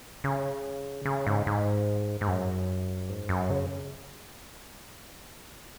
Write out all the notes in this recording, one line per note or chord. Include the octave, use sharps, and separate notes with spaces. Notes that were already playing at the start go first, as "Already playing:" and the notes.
C#3
C#3
G#2
G#2
G#2
F#2
G#2
F#2
C#3